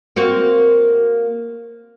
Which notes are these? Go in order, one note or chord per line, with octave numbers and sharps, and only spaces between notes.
A#3 C4 F#4